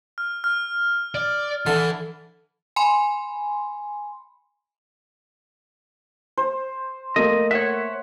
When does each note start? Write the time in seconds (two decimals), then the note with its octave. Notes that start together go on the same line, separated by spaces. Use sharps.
0.18 F6
0.44 F6
1.15 D5
1.67 D3 E3 A6
2.76 G#5 B5 C6
6.38 C5
7.16 A3 A#3 D#5
7.51 C#5 E5 F#5